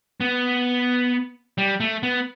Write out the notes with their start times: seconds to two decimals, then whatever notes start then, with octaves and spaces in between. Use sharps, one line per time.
0.21 B3
1.58 G3
1.80 A3
2.03 B3